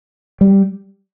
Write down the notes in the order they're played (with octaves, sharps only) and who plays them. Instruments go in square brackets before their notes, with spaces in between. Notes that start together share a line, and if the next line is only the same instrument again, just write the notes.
[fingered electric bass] G3